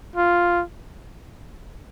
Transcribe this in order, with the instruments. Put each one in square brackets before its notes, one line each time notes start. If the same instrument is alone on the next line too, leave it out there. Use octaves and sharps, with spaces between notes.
[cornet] F4